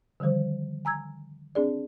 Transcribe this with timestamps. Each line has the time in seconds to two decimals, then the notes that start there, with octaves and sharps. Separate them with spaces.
0.20 D3 D#3 F3 G3 C5
0.85 G#5 A#5 E6 G#6
1.55 C4 D4 G#4 D5